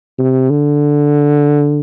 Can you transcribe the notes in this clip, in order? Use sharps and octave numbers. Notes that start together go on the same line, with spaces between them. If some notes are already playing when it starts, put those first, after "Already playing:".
C3
D3